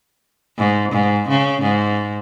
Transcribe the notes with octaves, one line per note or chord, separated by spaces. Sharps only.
G#2
G#2
C#3
G#2